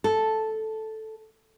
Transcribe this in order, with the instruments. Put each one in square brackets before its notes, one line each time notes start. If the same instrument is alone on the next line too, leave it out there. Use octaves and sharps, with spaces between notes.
[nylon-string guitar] A4